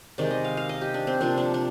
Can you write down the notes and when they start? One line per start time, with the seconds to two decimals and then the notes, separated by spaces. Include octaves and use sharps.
0.18 C3 D#3 G#3 D5
0.31 D#5
0.44 F5
0.57 F5
0.69 D#5
0.81 G4
0.94 D4
1.07 C4
1.21 C3 F3 A#3 D4
1.38 D4
1.54 D4